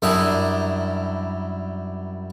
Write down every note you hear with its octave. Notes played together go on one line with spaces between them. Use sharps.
F#2 G3 D4 E4 A#5 D#6